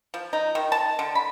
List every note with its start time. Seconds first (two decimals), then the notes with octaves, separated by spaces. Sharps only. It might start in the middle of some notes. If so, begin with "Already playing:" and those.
0.14 F3
0.33 D#4
0.55 D#3
0.72 A5
0.99 D3
1.15 B5